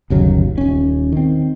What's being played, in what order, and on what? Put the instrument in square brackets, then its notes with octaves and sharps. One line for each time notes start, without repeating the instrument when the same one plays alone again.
[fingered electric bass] G1 D#2 C#3 F#3
D#1 C#4
D#3 C4